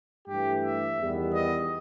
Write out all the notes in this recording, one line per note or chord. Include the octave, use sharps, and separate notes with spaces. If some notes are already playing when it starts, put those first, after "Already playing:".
G2 E3 A3 G4
E5
E2 D#3 G3 B3
D#5